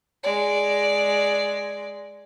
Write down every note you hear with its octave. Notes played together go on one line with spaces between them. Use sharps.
G#3 D5